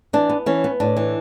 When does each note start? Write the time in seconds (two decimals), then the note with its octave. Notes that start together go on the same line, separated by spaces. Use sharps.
0.13 E3 D4
0.30 B3
0.46 E3 C#4
0.64 B3
0.80 A2 D4
0.97 E3